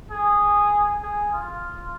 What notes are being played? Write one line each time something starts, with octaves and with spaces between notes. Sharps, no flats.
G#4
G#4
F4